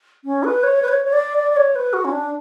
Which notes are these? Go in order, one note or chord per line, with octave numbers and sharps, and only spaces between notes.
C#4
B4
C#5
B4
C#5
C#5
D5
D5
D5
C#5
B4
F#4
C#4
D4